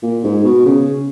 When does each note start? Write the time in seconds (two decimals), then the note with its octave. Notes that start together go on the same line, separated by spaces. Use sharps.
0.02 A#2
0.24 G#2
0.44 B2
0.65 C#3